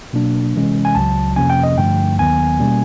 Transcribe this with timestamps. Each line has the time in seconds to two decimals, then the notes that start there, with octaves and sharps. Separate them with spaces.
0.13 B2 F#3 A#3 D4
0.54 C3 E3 G#3 C#4
0.85 G#5
0.95 C#2 C#3 F#3 A5
1.36 F2 C3 F3 A#3 C#4 G#5
1.50 G5
1.63 D#5
1.78 G2 D3 F3 A3 G5
2.19 D#2 D#3 F#3 B3 G#5
2.59 B2 G3 A#3 C#4